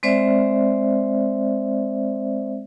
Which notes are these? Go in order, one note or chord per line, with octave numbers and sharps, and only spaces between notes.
G#3 C4 C5 D5 E5